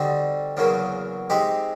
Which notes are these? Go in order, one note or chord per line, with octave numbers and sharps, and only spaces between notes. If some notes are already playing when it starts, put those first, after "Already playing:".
Already playing: D3 G3 C4 D#4 F#4
E2 C#3 F#3 A#3
G#3 C4 D#4 G4